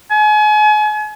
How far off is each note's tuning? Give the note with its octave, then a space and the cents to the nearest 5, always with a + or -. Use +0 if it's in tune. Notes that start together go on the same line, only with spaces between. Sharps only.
G#5 +35